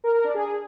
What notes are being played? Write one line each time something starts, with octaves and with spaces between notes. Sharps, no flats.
A#4
A#4
D4
G#4